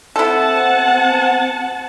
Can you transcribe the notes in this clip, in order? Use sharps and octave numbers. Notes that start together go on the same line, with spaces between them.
C4 E4 A4 F#5 A5